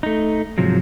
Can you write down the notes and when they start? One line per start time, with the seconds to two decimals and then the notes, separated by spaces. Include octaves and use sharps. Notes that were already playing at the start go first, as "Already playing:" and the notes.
0.03 A3 D#4
0.58 G#2 C3 F3 F#3